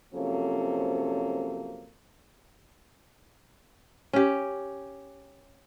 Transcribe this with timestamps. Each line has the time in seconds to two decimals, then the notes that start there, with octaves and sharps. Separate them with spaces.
0.15 C3 F3 F#3 A#3 C#4 A4
4.13 C#4 G4